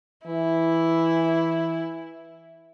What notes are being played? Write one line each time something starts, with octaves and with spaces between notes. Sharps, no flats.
E3 E4